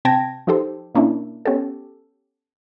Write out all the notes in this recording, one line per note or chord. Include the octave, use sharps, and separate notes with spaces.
C3 C4 G5 A5 G#6 A#6
F3 D#4 G4 A4 C5
B2 A#3 C#4 D4 E4
B3 C#4 G4 A4